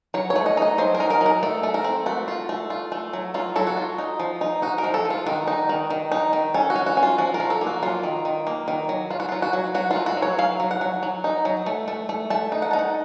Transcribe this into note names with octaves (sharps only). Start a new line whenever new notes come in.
F#3 C#5
C#5
A3
D#5
D#4 D#5
F#3 C5
A#4
D#4
A#4
F#3 A#4
A3 A4
A3
A#4
C4
A3 F#4
F4
A3
F4
A3
F#3
F#3 F4
F#3 A4
F#4
F4
D#4
F3
D#4
D#4 F#4
A#4
F3
A4
F3
F4
D#3 F#4
D#4
D#3
D#3
D#4
D#3
C#4 A4
F#4
C#4
F#4
C#4
F4
F3 F#4
A#4
F3
A4
A#3
F#4
F#3 F4
D#3
D#3
A#3
D#3
F#3
F#3 F4
F#4
F#3 F4
F#4
F#3
F#3 F#4
F4
A3
F#4
F#3
C#5
F#3 F5
F#3
F#5
F#3
F#3
D#4
F#3
A3
A3
A3
A3 A5
D#4
F#5
D#4 A5
F#5